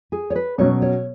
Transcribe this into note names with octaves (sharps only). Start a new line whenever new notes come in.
G#4
C#5
B4
B2 F#3 C#4 C#5
C#5